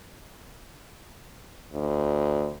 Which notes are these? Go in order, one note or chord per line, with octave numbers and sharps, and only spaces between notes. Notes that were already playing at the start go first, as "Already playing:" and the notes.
D2